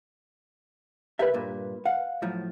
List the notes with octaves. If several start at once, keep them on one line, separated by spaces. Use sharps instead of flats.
C2 G4 A#4 B4 E5
G2 A#2
F5 F#5
A2 F3 F#3